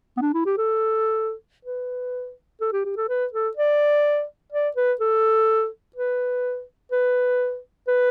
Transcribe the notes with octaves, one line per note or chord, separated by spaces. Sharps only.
B3
D4
E4
G4
A4
B4
A4
G4
G4
A4
B4
A4
D5
D5
B4
A4
B4
B4
B4